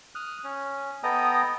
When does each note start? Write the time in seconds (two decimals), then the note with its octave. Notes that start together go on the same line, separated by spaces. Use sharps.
0.15 D#6 F6 F#6
0.44 C#4
1.03 B3 A4 D#5 G5 A#5 D#6